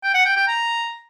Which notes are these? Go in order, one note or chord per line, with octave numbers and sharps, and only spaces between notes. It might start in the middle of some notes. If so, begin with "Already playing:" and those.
G5
F#5
G5
G5
A#5